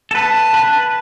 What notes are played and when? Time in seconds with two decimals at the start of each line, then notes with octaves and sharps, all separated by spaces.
0.11 A4
0.15 B4 A5
0.54 B4